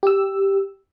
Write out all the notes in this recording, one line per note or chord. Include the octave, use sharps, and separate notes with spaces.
G4 E6